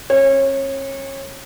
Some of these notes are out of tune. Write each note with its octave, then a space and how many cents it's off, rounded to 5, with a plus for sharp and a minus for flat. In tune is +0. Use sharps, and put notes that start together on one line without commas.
C#4 -45 C#5 -25